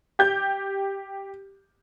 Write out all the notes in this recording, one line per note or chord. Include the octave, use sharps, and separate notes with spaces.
G4 G6